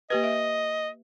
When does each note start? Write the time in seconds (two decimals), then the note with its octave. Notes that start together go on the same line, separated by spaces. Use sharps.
0.10 A#3 G4 B4 D#5
0.23 E5